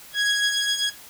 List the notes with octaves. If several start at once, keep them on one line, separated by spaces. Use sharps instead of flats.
G#6